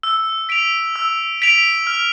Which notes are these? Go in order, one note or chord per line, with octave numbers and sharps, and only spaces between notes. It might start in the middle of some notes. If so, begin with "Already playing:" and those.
E6
B6 D7 F7
E6
B6 D7 F7
F6